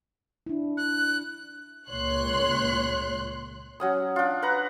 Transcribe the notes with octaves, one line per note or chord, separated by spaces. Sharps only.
D4 E4
F#6
C#2 A#2 C#5 C6 F#6
F#3 C#4 D#6
D4 F4
B4 F#5 A#5